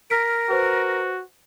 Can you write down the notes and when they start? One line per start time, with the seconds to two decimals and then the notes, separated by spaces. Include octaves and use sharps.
0.10 A#4 F6 B6 D7
0.50 F#4 B4 C5